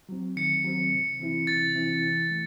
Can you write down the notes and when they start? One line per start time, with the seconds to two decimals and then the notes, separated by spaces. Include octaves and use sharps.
0.09 F#3 C4
0.36 D#3 C#7
0.64 F#3 C4
0.92 C3
1.20 E3 C4 E4
1.47 C3 A6
1.75 E3 C4 E4
2.03 E3
2.31 A3